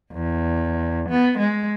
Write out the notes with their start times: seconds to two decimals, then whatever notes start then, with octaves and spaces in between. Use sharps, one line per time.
0.12 E2
1.09 B3
1.38 G#3